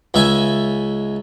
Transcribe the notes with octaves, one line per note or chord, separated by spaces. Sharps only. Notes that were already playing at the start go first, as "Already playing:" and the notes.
C#2 E5 G#5